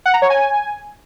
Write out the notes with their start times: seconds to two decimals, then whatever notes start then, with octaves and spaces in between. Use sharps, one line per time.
0.06 F#5
0.14 A#5
0.22 C#5
0.30 G#5